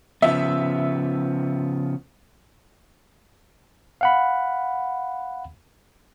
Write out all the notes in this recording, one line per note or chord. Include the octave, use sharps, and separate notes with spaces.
C#3 F3 B3 E5
F5 F#5 B5